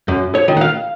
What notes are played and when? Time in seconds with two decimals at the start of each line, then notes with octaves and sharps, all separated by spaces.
0.08 F#2
0.35 C#5
0.48 D#3
0.57 F#5
0.61 F5